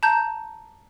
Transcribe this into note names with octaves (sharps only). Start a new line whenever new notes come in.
A5 A#5 G6